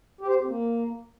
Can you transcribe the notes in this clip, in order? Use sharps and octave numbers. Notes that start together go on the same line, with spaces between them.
G4
C5
G4
C4
A#3